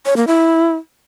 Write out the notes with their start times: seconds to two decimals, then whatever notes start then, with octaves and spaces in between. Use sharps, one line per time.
0.06 C#5
0.16 A#3
0.27 E4